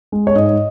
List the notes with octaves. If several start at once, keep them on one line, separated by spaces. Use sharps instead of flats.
G#3
C#5
G#2 D#5